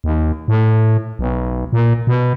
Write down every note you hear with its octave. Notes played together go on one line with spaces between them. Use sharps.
D#2
A2
B1
A#2
B2